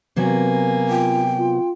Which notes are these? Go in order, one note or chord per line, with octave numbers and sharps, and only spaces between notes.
C3 F#3 A#3 B3 G#5
F4 G5
F4